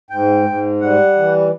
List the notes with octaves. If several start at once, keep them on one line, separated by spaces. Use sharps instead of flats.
G#2 G5
G#2
G3 F#5
E3